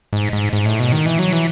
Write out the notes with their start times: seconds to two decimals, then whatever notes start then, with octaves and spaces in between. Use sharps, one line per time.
0.13 G#2
0.33 G#2
0.53 G#2
0.66 A2
0.80 B2
0.93 D#3
1.06 E3
1.19 F#3
1.33 E3